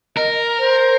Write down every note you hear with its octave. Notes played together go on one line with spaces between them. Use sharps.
A#4 D#5
C5